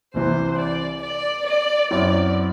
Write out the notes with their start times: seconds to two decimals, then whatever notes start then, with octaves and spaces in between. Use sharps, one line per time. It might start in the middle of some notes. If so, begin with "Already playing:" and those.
0.14 C2 C3 E3 C5
0.58 D5
1.02 D5
1.46 D5
1.90 F#2 F#3 C4 E4 D5